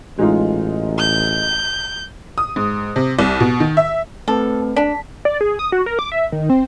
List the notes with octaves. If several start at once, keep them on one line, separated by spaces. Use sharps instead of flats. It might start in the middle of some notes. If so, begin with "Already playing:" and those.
A1 G#3 D#4 F4
G6
D#6
G#2
C3
C2
B2
D#3
E5
A3 C4 A4 B4
D4 B6
D5
G#4
D#6
F#4
A#4
D6
E5
D#3
C4